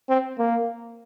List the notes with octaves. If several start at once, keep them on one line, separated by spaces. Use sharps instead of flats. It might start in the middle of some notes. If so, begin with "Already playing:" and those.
C4
A#3